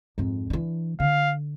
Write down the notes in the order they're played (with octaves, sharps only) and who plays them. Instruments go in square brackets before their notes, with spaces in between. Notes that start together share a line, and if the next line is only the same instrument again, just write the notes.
[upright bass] F2 G#2
E3 D4
[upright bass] D3 [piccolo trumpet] F5